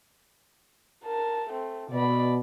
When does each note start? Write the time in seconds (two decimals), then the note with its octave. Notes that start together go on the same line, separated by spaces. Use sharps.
1.05 A#4 A5
1.50 A3 C4
1.90 B2 D5 B5